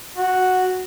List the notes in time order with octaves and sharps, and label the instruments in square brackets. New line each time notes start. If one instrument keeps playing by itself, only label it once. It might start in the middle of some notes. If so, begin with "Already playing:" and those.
[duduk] F#4